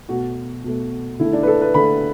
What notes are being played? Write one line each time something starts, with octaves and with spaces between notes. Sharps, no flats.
B2 A3 F#4
B2 A3
D3 A3 E4
D4
B4
A4
B4
D3 A3 B5